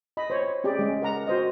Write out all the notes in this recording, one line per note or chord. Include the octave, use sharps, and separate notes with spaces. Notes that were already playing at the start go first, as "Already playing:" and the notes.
D#5 B5
C5 C#5
C#4 G4 G#4 D5
G#3 C#4
A#4 F#5 A#5
F#4 C5 D#5